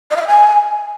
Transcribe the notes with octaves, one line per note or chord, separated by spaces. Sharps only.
D#5
F5
E5
G#5